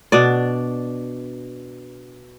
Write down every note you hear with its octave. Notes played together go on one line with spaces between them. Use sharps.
B2 D4 D5